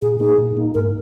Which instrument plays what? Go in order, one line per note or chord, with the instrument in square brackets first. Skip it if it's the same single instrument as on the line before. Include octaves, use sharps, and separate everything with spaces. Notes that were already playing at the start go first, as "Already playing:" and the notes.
[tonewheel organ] A#2 [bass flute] G#4
[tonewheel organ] A#3 D#4 [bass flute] G#4
[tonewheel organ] A#2
A#3 D#4
[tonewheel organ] G#2 [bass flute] A#4